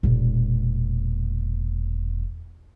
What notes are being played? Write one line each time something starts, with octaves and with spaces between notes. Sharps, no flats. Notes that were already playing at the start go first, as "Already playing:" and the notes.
E1 A#2